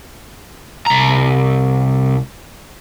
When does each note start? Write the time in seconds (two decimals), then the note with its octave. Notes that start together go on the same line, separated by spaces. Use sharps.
0.86 C2 A#5